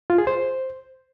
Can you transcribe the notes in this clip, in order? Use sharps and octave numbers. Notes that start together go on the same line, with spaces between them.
F4
G#4
C5